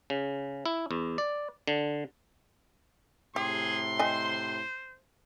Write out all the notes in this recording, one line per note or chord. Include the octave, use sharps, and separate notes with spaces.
C#3
E4
E2
D5
D3
A2 C3 G4 G#4 C6
C5 D#5 G5 G#5